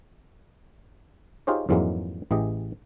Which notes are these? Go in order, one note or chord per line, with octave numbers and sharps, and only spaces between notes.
D#4 F4 G4 G#4 C5 C#5
F2 G#2 E3 F#3 G#3 A#3
A1 E3 G4 G#4 D#5